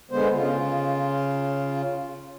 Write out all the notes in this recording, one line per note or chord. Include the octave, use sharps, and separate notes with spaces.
D3 G#3 B3 C5
C#3 F4